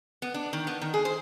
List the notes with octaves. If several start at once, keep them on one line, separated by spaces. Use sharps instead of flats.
B3
D4
D#3
B3
D#3
G#4
C5